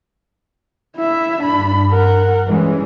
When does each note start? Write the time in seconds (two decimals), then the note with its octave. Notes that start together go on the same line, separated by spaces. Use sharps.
0.97 E4 E5
1.41 G2 D4 B5
1.91 A#4 F#5
2.48 E3 G3 G#3 C#4